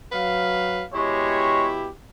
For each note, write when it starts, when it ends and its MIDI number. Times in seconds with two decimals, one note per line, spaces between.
0.12 0.84 54
0.12 0.84 71
0.12 0.84 77
0.94 1.88 47
0.94 1.70 56
0.94 1.88 64
0.94 1.88 67
0.94 1.70 73